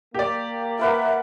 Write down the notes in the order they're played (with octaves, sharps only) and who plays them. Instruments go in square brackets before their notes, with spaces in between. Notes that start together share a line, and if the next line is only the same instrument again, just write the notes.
[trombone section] A#3 [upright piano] G4 D5
[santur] A#4 B4 F#5 [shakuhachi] E5